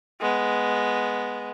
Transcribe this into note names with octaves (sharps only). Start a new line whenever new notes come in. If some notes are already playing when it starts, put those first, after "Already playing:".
G#3 B3